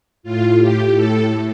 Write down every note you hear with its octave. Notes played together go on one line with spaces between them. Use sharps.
A2 F4
G4
A2 A4